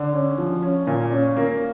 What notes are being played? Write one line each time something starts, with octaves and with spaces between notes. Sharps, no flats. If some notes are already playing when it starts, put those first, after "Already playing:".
Already playing: D3
C#4
F3
C#4
A#2
C#4
A#3